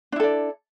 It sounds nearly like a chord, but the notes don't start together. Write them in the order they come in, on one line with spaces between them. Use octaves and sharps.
D4 E4 A4 D5